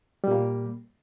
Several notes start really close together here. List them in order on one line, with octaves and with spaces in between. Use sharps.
G3 A#2 A#3